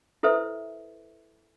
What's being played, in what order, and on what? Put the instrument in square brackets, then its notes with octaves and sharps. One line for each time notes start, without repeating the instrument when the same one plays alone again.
[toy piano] E4 A4 B4 C5 E5